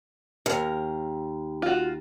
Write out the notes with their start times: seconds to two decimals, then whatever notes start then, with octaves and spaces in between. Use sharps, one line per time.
0.46 D#2 A#4
1.62 F4 F#4